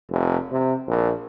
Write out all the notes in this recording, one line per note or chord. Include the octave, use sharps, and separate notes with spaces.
F1
C3
A#1